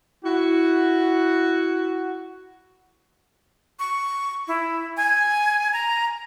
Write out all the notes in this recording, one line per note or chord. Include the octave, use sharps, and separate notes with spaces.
E4 F#4
C#6
E4
G#5
A#5